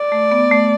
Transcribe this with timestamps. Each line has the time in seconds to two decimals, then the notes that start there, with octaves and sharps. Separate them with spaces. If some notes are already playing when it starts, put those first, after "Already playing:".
Already playing: D5
0.12 A3
0.32 B3
0.51 A3